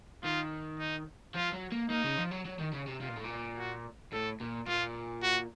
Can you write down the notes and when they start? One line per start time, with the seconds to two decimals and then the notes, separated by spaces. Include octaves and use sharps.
0.24 D#3 F4
0.79 D#4
1.35 F3 F4
1.53 F#3
1.72 A#3
1.90 A#3 D#4
2.04 C#3
2.18 F3
2.31 F#3
2.46 F#3
2.60 D#3
2.74 C#3
2.88 C3
3.01 C3 F4
3.09 A#2
3.17 A2
3.24 A#2
3.57 F#4
4.12 A2 A4
4.40 A#2
4.67 A#2 F4
5.23 F#4